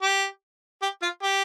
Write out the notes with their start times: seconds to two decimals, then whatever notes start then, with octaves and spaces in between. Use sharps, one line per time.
0.02 G4
0.82 G4
1.02 F4
1.22 G4